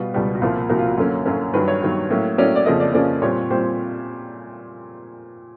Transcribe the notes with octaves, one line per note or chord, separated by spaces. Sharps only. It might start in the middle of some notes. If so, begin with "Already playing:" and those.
Already playing: B2 G3 B3 F4
C#2 B2 G3 B3
F#4
C2 A#2 F3 A#3 F4
C2 A#2 F3 A#3 F#4
F4
F#4
F#2 D3 F#3 A#3 C#4
F#2 D3 F#3 A#3 C#4
G2 D#3 F#3 B4
C#5
G2 D#3 F#3
A2 F#3 A#3 C#4
A2 F#3 A#3 C#4 D5
D5
F2 C#3 F3 A#3 C#4 D#5
D5
F2 C#3 F3 A#3 C#4 D5
A#2 G3 C4 C#5
A#2 G3 C4 C5